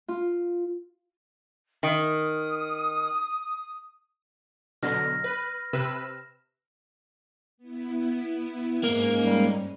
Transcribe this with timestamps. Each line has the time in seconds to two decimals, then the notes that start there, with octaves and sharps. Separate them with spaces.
0.08 F4
1.83 D#3 D#6
4.83 B2 D3 F#3 F6 A#6
5.24 B4
5.73 C3 B4 E6
7.58 B3 E4
8.83 G#2 G#3 A#3 C#4 D#4
9.26 G3